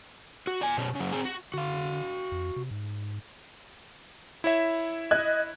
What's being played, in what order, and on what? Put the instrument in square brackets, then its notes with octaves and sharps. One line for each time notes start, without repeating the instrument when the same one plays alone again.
[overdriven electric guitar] F#4
D5 G#5
B2 C#4
C#3 F#3
C4 G#4
F#4
[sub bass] D3 [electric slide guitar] F#4 F5
[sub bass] F2
C3
G#2
[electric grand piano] E4 C#5 E5
[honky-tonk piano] D#5 F#6 G#6